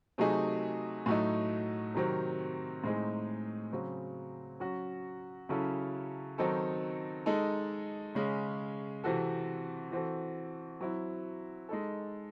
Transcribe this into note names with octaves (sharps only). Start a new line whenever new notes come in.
C3 F#3 A3 D#4 G#4
A2 F#3 A3 D#4
C3 D#3 F#3 C4
A2 G#3 C4 D#4 G#4
C#3 F#3 C4
F#3 C#4 F#4
C#3 F#3 C#4 E4 A4
D#3 F#3 C4 D#4 A4
G#3 D#4 A4
C#3 G#3 C#4
C3 E3 C4 F#4 A4
E3 C4 F#4 A4
F#3 C4 E4
G#3 D#4 A4